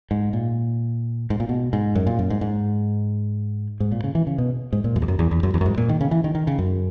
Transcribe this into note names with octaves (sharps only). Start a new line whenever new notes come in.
G#2
A#2
G#2
A#2
B2
G#2
F#2
A#2
F#2
G#2
G#2
G#2
A#2
C#3
E3
C#3
B2
G#2
A#2
F#2
E2
F#2
E2
E2
F#2
E2
F#2
G#2
A#2
D#3
C#3
E3
D#3
D#3
C#3
F#2